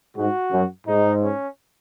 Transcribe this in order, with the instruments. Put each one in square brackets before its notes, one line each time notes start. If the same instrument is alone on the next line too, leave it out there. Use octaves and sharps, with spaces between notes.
[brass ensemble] G#2 [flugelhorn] F#4
[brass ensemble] F#2
[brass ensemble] G#2 [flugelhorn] D#4
[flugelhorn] C#4